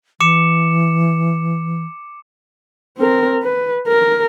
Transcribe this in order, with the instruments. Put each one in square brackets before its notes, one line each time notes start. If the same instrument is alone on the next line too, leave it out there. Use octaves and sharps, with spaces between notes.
[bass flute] E3 [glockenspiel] D6 C#7 E7
[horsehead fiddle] C4 A#4
B4
A#4